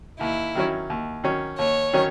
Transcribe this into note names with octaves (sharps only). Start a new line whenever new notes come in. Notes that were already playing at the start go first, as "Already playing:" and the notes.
D#2 E4
D#3 F#3 C#4
D#2
D#3 F#3 C#4
D#2 C#5
D#3 F#3 C#4